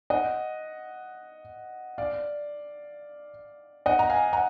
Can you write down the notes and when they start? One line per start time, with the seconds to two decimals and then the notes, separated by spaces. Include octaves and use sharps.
0.10 D#5 F#5
1.98 D5 F5
3.86 D#5 F#5
3.99 A#5
4.10 F5 G#5
4.33 F#5 A#5